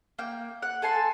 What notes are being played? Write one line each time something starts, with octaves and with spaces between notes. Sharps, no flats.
A#3 G5
F#5
A4 G#5 A5 C6